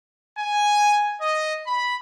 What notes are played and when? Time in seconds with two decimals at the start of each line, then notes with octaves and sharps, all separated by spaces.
0.38 G#5
1.20 D#5
1.65 B5